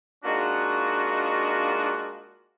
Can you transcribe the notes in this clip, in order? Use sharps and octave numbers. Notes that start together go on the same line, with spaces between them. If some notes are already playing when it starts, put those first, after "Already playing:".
G#3 A#3 D4 D#4 F4 F#4